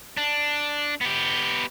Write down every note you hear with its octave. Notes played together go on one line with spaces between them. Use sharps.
D4
B3 G4